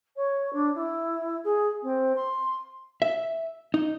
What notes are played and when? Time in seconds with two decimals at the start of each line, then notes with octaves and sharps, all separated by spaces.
0.16 C#5
0.53 D4
0.75 E4
1.44 G#4
1.82 C4
2.15 C6
3.02 E5
3.74 D#4